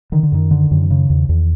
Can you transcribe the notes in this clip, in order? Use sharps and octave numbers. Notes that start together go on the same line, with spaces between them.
D3 D#3
D3
F#2 D#3
D3
F#2
C#3
E2
E2